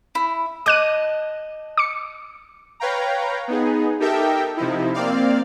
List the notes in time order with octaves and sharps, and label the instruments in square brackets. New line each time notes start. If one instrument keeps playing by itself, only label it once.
[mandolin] E4
[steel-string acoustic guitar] D#5 A5 [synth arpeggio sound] D6 F#6 D#7
[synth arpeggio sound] D6 C#7
[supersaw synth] B4 C#5 F5 G5 A#5
B3 D#4 G#4
D#4 G4 A4 A#4 E5 G5
C3 F3 D#4 E4
A#3 C4 D5 F5